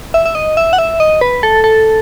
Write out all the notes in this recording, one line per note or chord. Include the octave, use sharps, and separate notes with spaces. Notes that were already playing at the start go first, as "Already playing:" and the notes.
E5
E5
D#5
E5
F#5
E5
D#5
B4
A4
A4